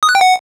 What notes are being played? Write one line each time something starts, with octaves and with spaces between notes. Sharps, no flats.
D#6
F#6
G5
F#5